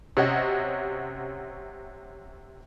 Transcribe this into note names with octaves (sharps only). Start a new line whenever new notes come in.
C3 C#4 F#4 D#5